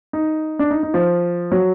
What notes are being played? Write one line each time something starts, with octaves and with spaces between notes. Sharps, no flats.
D#4
D4
D#4
D#4
F3
F#3